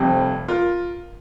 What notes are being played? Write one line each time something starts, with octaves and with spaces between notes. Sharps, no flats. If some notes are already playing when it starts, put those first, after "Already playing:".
Already playing: F1 F2 C3 G3
F4 A#4